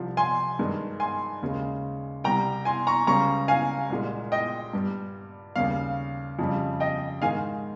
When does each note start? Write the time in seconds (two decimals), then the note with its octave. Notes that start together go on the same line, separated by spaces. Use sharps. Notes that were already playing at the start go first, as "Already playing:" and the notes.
Already playing: C2 C3 F3
0.17 G#5 C6
0.59 G2 D#3 G#3
1.00 G#5 C6
1.42 D#2 C#3 G#3
2.24 C2 C3 G3 G5 A#5
2.65 G#5 C6
2.87 A#5 C#6
3.07 C#2 C#3 G3 A#5 C#6
3.48 F5 G#5
3.90 C2 A#2 G#3
4.32 D#5 G5
4.73 G2 G3
5.56 D#2 C#3 G3 F5
6.39 F2 C#3 G3
6.80 D#5 G5
7.22 G#2 D#3 G#3 F5 G#5